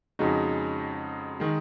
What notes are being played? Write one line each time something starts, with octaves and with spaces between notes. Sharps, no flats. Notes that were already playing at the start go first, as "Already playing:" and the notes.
F2 C#3 G#3 D#4 F#4
D#3 G#3